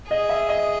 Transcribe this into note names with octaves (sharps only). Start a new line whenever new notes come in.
G#4 D#5
E5
D#5